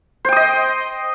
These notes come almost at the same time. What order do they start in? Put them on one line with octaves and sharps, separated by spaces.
C5 G5 D#6 D#5